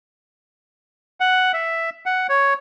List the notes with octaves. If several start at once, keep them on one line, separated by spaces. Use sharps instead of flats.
F#5
E5
F#5
C#5